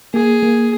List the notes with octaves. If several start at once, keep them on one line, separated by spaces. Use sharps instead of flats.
A#3 G#4
A#3